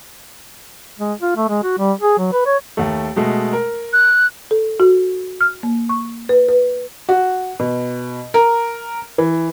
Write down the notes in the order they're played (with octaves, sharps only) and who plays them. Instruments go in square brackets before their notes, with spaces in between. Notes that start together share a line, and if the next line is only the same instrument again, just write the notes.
[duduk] G#3
F4
A3
G#3
F#4
G3
G#4
F#3
B4
C#5
[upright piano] D#2 A3
B2 G#3 A3
A#4
[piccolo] F#6
[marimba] A4
F#4
F6
A#3
C#6
B4
B4
[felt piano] F#4
B2
A#4
E3